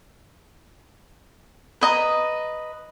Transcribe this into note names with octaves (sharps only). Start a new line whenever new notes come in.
B4 D#5 A#5